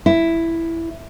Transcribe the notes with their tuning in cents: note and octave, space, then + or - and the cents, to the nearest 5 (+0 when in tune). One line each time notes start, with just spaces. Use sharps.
E4 +5